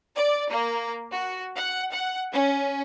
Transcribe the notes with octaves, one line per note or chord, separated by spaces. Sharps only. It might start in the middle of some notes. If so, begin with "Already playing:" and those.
D5
A#3
F#4
F#5
F#5
C#4